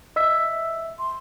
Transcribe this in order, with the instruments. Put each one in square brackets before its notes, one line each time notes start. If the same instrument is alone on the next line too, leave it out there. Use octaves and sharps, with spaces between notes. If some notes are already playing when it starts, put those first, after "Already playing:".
[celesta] D#5 E6 B6 [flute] E5
[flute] C6